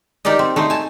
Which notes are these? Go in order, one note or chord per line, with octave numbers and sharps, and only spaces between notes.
D#4 G4 A#4 D5 D#5
C4
A3 D#4 C5
G#5 A5